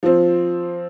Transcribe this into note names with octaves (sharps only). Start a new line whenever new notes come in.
F3 C4